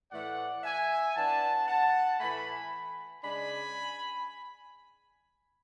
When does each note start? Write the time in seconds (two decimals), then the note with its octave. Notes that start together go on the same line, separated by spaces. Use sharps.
0.11 A2 E3 A3 D5 F#5
0.63 E5 G#5
1.15 E3 B3 D4 F#5 A5
1.67 F#5 A5
2.20 A2 E3 A3 G#5 B5
3.24 C#3 G#3 D4 G#5 B5